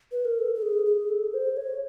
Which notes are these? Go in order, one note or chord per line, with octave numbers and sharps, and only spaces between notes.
B4
A#4
A4
A4
G#4
G#4
A4
C5
C#5